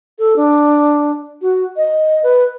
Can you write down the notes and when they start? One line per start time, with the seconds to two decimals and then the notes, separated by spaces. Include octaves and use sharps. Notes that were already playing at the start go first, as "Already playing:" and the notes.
0.19 A4
0.36 D4
1.42 F#4
1.76 D#5
2.23 B4